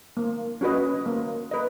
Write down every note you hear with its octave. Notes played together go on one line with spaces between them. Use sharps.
A#3
C#4 F#4 B4 D#5
A#3
B4 D#5